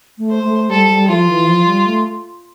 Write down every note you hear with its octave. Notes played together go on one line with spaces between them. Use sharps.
A3
C5
A3
G3 A4
G3
F3 F4
E3
F3
G3
A3